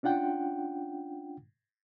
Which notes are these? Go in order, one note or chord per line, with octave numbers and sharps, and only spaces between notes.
C#4 D4 F4 F#5 G5